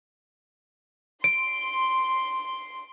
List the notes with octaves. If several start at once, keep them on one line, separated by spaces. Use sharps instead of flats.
C6 D7